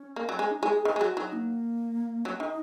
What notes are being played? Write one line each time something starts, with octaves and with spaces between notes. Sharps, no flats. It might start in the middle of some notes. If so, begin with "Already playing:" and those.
Already playing: C#4
A#3
F#3
G#3 C#4
D#4
G#3 G#4
G#4
D#3 G#4
G#3
F#3 F#4
F#3 D#4
A#3
F#3 C#4
D#3 D#4